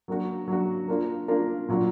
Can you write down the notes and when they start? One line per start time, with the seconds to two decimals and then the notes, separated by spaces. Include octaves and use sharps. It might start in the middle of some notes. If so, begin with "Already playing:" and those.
0.08 F#3 A#3 D4 F#4
0.48 F#3 A#3 D4 F#4
0.88 A#3 D4 F4 A#4
1.28 A#3 D4 F4 A#4
1.68 A#2 F#3 A#3 D4 F4